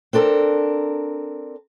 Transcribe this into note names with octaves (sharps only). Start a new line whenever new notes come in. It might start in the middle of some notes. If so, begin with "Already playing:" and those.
C4 D4 A4 A#4